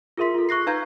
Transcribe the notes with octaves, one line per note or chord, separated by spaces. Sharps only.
F4 G#4 A#4 E5 C6 B6
F4 A4
C#6 F#6 A#6 C7
D#4 B4 F5 A#5 G6 G#6